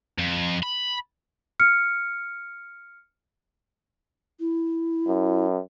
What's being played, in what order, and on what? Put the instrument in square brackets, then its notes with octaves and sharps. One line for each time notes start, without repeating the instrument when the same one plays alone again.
[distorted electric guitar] F2
B5
[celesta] F6 C#7
[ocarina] E4
[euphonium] F#2